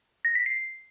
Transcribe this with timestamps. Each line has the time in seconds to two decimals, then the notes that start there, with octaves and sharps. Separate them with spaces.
0.25 A#6
0.35 B6
0.46 C7